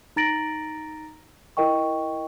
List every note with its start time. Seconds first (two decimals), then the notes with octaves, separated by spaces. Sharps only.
0.16 D#4 A#5 A6 A#6 D7 F#7
1.57 E4 A#4 D#5 G5 C#6